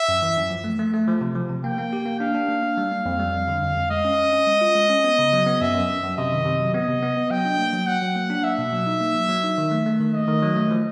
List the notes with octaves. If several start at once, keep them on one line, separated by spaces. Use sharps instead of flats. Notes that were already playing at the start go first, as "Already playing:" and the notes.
Already playing: E5
F#2
E3
F#2
F3
A3
A3
A3
F3
C3
F3
C3
A#3 G5
A#3
G4
A#3
D4 F5
D4
A#3
D4
G3
A#3
F2
G3
F2
D3
F2
F2
G#3 D#5
C#4
C#4
C#4
G#3
F4
G#3
C#4
B3
C#3
F#3
B3
F#2 E5
F#2
F#2
F#2
C3 D#5
D#3
C3
F#3
B3 D#5
C3
B3
B3
F#3 G5
D4
A#3
F#3
F#3 F#5
F#3
A#3
D4
A#3 E5
B2
F#3
D#4
A#3
F#3
F#3
D#4
D#3
A3
A3
D#3
A3 D#5
D#3
F#3
A3
F3